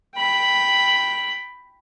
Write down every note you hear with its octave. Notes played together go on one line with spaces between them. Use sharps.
G5 B5